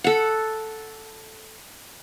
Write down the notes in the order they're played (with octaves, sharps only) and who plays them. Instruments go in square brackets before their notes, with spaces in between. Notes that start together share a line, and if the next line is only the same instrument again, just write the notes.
[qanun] A4 F#5